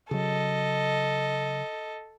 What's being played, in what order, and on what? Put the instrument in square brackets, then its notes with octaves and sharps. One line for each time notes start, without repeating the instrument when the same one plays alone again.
[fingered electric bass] C#3 F#3 [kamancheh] A4 D#5